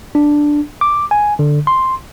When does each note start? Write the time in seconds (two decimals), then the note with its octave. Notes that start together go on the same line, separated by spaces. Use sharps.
0.15 D4
0.81 D6
1.11 G#5
1.39 D3
1.67 C6